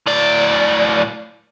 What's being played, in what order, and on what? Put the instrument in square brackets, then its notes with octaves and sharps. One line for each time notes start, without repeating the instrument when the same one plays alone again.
[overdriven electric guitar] A2 D5